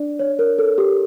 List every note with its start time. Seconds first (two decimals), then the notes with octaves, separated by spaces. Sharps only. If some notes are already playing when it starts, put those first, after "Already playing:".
Already playing: D4 D5
0.19 C#5
0.39 A#4
0.58 A4
0.78 G4